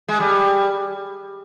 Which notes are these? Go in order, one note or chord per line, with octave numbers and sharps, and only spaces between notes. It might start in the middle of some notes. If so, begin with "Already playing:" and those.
G#3
G3